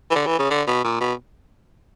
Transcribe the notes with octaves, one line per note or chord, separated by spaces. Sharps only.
E3
D3
E3
C#3
D3
B2
A#2
B2